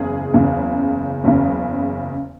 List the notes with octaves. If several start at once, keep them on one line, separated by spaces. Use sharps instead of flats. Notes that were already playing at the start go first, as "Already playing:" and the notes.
Already playing: F#1 E2 C#3 G#4
F#1 E2 C#3
F#1 E2 C#3